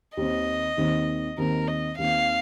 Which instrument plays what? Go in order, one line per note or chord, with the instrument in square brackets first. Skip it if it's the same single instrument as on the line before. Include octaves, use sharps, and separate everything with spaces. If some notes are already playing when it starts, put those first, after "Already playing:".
[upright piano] D#2 D#3 C4 [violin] D#5
[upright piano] D#2 D#3 C4
[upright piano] D#2 D#3 C4 [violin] A#4
[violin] D#5
[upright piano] D#2 D#3 C4 [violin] F5